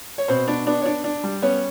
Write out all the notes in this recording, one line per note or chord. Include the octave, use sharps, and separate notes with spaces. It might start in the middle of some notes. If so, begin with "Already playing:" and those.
C#5
B2 C4 C5
B3 D4 D5
B3 D4 D5
C#5
D4 D5
D4 D5
G3
B3 C#4 C#5